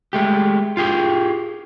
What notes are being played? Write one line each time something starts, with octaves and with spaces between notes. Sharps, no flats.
G#3 A3 G4
F4 G4 G#4